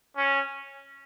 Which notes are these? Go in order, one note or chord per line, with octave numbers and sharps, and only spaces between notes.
C#4